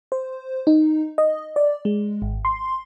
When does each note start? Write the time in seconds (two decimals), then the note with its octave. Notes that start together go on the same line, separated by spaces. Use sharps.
0.12 C5
0.67 D#4
1.18 D#5
1.56 D5
1.85 G#3
2.22 G#1
2.45 C6